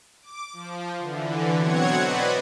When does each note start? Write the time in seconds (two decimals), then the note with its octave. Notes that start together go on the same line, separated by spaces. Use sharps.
0.22 D6
0.53 F3
0.99 D3 E3
1.56 B2 F#3 C4 C#5 F#5 G#6
1.99 B4 C5 D5 D#5 F#5 B5